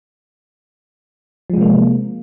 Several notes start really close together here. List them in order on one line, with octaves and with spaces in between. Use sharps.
F3 G#3 C3 A#3